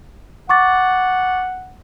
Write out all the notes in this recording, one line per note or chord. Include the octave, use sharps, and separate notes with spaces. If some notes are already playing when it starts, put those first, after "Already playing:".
F#5 C#6 D6 A6